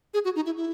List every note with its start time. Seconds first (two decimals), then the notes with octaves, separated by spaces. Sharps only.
0.14 G#4
0.25 F#4
0.36 D#4
0.46 E4
0.57 E4